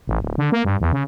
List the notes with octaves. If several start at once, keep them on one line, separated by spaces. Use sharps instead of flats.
A1
D1
D3
A#3
G2
E2
C#3